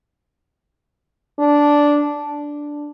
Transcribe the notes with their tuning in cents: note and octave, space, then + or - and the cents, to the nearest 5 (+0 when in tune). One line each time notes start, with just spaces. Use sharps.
D4 -5
D4 -5